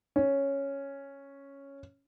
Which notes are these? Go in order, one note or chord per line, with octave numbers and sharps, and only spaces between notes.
C#4